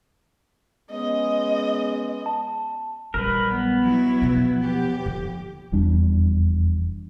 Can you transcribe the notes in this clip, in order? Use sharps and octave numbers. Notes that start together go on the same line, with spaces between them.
G#3 B3 C#4 D#5
A5
A#1 F#3 G3 A#4 B4
B3
F#3 E4
B2 F3
D#2 G4
D3 F3
F1 E2 G3 D4